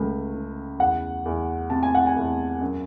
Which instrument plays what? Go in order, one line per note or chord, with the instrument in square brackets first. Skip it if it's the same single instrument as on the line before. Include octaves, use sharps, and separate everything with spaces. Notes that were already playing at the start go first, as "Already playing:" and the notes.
Already playing: [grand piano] C#2 A3
C#3
E2 F#5
E2
C3 A5
G#5
F#5
G#5
E2
F#2